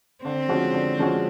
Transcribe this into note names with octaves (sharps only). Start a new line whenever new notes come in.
D3 C4
F3 G#3 C#4 F#4
D3
F3 G#3 C#4 F#4